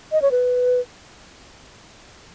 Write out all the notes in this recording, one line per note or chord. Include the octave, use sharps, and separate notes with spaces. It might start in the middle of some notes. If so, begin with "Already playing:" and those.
D#5
C#5
B4